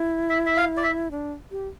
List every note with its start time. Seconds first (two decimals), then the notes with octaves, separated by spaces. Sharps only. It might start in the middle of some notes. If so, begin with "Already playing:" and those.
Already playing: E4
0.30 E5
0.46 E5
0.57 F5
0.77 D5
0.83 E5
1.11 D4
1.51 G4